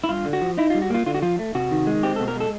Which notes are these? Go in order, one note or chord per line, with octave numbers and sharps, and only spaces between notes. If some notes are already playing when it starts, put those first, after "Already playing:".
E4
G2 F4
D3
F#4
F3
D#4 E4
F4
G3
F#4
A#3 F4
D3 F4
F#4
F3 F4
A3
C3 F#4
D#3
G#3
C4 G4
A4
B2
A#4
G#3 A4